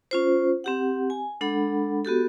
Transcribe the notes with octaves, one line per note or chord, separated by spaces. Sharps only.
C#4 F4 C5
C4 G4 F#5
G#5
G#3 D4 A4 F#5 B5
B3 F#4 G4 A4